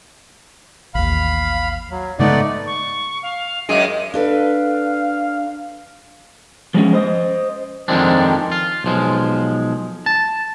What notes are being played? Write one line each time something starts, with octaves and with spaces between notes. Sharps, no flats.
A1 D#2 F5 B5
F#3
G#2 C#3 G#3 A3 B3 D#4 D5 F#5
C#6
F5
F#2 G#3 D#7
D4 A4 B4 F5
F3 G#3 C#4
C5 D#5
F2 D#3 F3 G#3 C4 D4
F4
B1 F3 G#3
A5